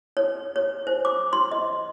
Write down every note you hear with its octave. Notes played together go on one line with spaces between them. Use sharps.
C#5
C#5
C5
D6
C6
D#5